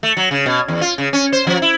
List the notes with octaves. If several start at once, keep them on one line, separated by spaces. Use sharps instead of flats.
A3
F#3
C#3
B2
E2
F4
C#3
C#4
C5
F3
E4